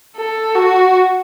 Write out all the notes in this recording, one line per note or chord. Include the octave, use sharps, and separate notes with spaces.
A4
F#4